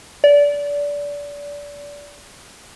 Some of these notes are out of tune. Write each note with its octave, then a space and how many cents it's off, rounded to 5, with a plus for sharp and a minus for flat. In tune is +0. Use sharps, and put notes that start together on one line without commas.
D5 -25